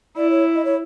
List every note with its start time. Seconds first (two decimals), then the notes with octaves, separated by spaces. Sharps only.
0.17 E4 D5
0.30 C#5
0.56 D#5
0.65 C#5